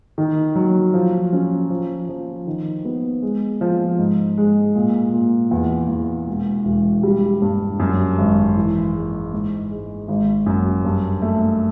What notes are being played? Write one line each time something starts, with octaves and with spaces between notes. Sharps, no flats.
D#3
F#3
F3
C#4
F3
F3
D#3
B3
G#3
F3
G#2
G#3
A#2
A#2
E2
E2
E1
E1
G3
G2
F#2
G#1
E3
G#3
G#2
G#3
G#1
F#2
G2
A3